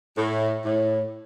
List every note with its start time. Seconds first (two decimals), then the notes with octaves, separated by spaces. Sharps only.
0.16 A2
0.65 A2